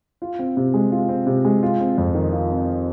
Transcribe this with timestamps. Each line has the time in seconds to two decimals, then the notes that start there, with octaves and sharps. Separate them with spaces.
0.22 F4
0.39 C4
0.57 C3
0.74 G#3
0.92 F4
1.09 C4
1.27 C3
1.45 G#3
1.63 F4
1.80 C4
1.98 F2
2.15 D#3
2.32 F4
2.51 C4